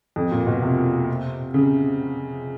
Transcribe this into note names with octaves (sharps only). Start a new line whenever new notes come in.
F2
A#2
B2
C3
C#3